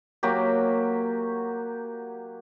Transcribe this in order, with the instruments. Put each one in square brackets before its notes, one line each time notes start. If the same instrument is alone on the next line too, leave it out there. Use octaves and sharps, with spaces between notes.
[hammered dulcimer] F#3 A#3 F#4 G4